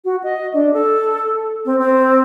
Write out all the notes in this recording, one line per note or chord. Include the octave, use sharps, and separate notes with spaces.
F#4
D#5
D4
A4
C4
C4